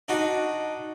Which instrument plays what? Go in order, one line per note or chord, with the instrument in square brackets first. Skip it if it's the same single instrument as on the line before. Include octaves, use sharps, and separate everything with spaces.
[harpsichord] D4 D#4 F#4